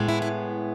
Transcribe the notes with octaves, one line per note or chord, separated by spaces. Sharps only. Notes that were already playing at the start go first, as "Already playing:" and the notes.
Already playing: A2 G#3 B3
E4
E4